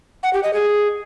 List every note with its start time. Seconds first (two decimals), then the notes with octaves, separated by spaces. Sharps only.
0.23 F#5
0.33 G4
0.43 D#5
0.53 G#4